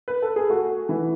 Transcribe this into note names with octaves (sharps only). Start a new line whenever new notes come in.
B4
A4
G#4
A3 F#4
E3